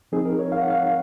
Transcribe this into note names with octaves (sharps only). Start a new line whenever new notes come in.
F3 C4 D#4 G#4
A#4
C#5
F5
F#5
F5